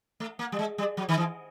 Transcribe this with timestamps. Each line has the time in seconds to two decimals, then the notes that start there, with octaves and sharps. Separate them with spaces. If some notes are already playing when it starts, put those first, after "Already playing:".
0.20 A3
0.39 A#3
0.52 G3
0.59 G#3
0.78 G3
0.97 F#3
1.09 D#3
1.18 E3